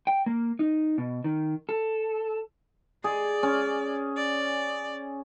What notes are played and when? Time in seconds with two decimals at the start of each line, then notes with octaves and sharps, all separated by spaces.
0.07 G5
0.26 A#3
0.59 D#4
0.98 B2
1.24 D#3
1.69 A4
3.04 G#4 D5
3.43 C#4
4.17 D5